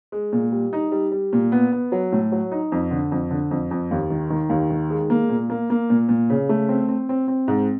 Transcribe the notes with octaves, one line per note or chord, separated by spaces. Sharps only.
G#3
A#2
G3
D#4
G3
G3
A#2
B3
B3
F#3
A2
F#3
D#4
F2
D3
F2
D3
F2
F2
D#2
D#3
D#3
D#2
D#3
G#3
A#3
A#2
A#3
A#3
A#2
A#2
C#3
A3
C4
C4
C4
C4
G#2